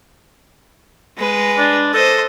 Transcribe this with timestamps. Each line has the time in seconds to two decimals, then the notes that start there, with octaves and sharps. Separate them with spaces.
1.17 G#3 B4
1.58 D4
1.94 A4 C5 D#5